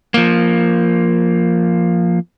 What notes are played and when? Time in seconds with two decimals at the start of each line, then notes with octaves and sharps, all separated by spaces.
0.14 F3 A#3